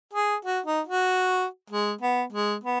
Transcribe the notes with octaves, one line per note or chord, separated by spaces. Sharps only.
G#4
F#4
D#4
F#4
G#3
B3
G#3
B3